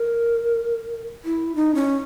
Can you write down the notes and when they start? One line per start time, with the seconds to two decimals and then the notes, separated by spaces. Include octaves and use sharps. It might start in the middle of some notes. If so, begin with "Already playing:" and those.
Already playing: A#4
1.24 E4
1.55 D#4
1.75 C#4